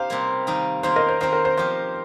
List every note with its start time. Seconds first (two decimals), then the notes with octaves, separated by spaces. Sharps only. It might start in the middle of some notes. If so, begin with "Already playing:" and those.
Already playing: D#4 G4 C5 F5 G5
0.10 C3 G3 A#3
0.47 D#3 G3 D#4
0.83 D#3 A#3 F4 C5
0.96 A#4 D#5
1.08 C5
1.21 D#3 C4 D#4 C5
1.33 A#4
1.45 C5
1.57 F3 D#4 G4 C5